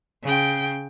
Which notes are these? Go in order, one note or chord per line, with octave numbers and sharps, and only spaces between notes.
C#3 G5